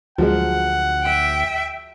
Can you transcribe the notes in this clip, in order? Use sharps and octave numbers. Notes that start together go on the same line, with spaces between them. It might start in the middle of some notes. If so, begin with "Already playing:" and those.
D2 F3 F#3 G#3 F#5
E5 G5